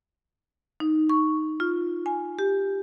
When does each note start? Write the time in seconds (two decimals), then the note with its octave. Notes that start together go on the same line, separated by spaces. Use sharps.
0.80 D#4
1.10 C#6
1.60 F4
2.06 G#5
2.39 G4